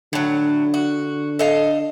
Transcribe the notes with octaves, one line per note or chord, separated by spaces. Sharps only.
A2 D3 F#3
F#4
A4 D#5 F5